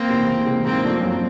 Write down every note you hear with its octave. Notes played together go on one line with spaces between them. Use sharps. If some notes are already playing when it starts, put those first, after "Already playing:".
Already playing: A#3 C4
C3 E3
C#2
C3 E3 G#3
G#2 A#3 C4
F3 A3 D4
F#2